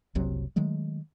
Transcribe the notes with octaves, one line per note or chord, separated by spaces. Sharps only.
F#1 C2 C3 F#3
D#3 F#3 G#3 A3